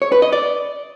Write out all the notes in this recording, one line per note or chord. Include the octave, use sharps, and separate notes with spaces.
C#5
B4
D#5
D5